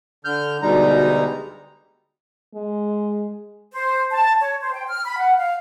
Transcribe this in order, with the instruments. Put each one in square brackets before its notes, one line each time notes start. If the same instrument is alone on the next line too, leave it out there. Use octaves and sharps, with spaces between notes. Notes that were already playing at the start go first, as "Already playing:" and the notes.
[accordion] D3 F6 G6
D2 B2 G3 G#3 D#4 A#5
[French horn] G#3
[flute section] C5
A5
C#5
C5
G5
F6
B5
F#5
F5